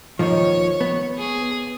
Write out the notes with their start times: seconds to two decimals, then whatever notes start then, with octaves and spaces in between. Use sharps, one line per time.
0.19 D#2 D#3 F3 C#5
0.81 B3
1.19 G#4